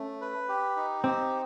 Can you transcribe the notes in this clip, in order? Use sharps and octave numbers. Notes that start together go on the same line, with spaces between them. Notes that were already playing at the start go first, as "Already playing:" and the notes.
Already playing: A3 C#4
B4
G4
D#4
C4 G4